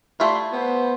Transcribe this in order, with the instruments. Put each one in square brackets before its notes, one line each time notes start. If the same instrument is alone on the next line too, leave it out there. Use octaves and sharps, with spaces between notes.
[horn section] G3 C6 [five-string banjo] A3 E4 F4
[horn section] B3 C5